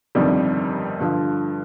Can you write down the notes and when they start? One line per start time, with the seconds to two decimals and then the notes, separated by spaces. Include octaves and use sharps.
0.15 G1 F2 C3 D#3 G3
1.00 G2 D3 F3